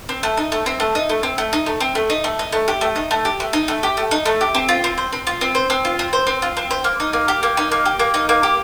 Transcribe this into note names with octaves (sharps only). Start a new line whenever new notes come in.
C4
A3
D#4
A3
C4
A3
D#4
A3
C4
A3
D#4
A3
C4
A3
D#4
A3
D#4
A3
G4
A3
D#4
A3
G4
A3
D#4
A3
G4
A3
D#4
A3
G4
C4
F4
C4
C5
C4
F4
C4
C5
C4
F4
C4
C5
C4
F4
C4
C5
A#3
D#4
A#3
G4
A#3
D#4
A#3
G4
A#3
D#4
A#3
G4